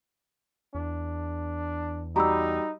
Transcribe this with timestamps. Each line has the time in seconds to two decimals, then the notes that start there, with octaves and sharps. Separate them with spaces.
0.75 E2 D4
2.16 G3 D#4 F#4 G4 A#5 B5 E6